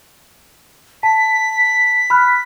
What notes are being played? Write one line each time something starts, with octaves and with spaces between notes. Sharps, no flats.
A5 B6
B5 F6 F#6